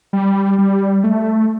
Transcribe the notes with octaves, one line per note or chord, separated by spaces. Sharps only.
G3
G3
A3